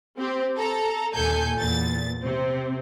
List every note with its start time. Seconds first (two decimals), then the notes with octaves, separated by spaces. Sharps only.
0.18 C4 G4
0.57 A4 A#5
1.14 D#2 A#2 A4 G#5 G6
1.58 E2 A#2 A6
2.23 C3 C4